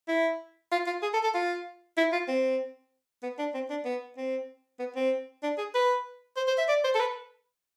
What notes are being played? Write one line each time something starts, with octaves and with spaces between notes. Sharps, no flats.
E4
F4
F4
G#4
A4
A4
F4
E4
F4
C4
B3
D4
C4
D4
B3
C4
B3
C4
D4
G#4
B4
C5
C5
E5
D5
C5
A4
B4